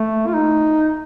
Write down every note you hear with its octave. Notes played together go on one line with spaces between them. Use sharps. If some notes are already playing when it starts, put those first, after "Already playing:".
Already playing: A3
F4
D#4